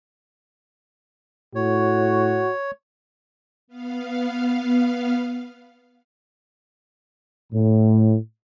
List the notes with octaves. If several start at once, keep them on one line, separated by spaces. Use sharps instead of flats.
A2 F#4 C#5
B3 F5
A2